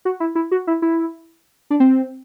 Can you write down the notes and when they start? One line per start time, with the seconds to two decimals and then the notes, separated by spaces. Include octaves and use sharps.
0.05 F#4
0.20 E4
0.35 E4
0.51 F#4
0.67 E4
0.82 E4
1.70 D4
1.80 C4